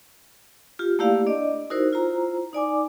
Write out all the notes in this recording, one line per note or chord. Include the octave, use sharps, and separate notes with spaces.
F4 G4
A3 A#3 E4 G4 D5 F5
D4 D5 D#5
D#4 E4 F#4 A#4 C5
E4 F4 C5 A#5
D#4 D5 G#5 D6